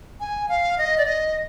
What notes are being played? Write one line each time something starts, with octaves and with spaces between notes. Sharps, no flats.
G#5
F5
D#5
D5
D#5